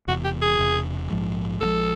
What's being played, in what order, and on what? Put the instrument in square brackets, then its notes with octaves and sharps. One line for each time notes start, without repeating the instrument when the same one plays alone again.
[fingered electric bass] E1 E2 C3 [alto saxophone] F#4
[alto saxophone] G4
G#4
[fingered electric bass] E1 E2 C3
A#1 G#2 F3 G#3
[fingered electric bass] A#1 G#2 F3 G#3 [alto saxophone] A4